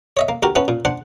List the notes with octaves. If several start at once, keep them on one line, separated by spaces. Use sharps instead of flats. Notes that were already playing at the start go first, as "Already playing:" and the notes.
C#5 D#5 E5
A#3
D2 F#4 G4 A#4
B3 C#4 E4 B4 A5
A#2
D4 C5 F#5